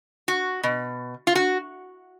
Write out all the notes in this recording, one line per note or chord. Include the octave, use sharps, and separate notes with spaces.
F#4
B2
F4
F#4